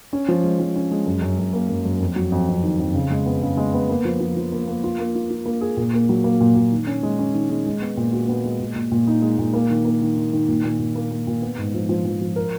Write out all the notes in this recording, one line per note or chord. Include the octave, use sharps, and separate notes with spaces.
C#4
F3
G#3
F3
C#4
G#3
F#2
F#2
F#2
A#3
F#2
F#2
F2
F#3
F2
F2
D#3
F2
C#3
G#3
B3
C#3
G#3
B3
A#3
F3
F3
F3
A#3
A#3
F4
A#3
F4
F4
A#3
G#4
A#2
A#3
F#3
A#3
A#2
A#2
D#3
C#4
G#3
C#4
D#3
G#3
G#3
B3
A#2
F#4
B3
G#3
A#2
A#2
A#2
D#4
G#3
A#2
A#3
D#3
A#3
D#3
D#3
D#3
A#2
A#2
A#2
A#3
A#3
A#2
B3
G#2
F3
F3
F3
F3
A#4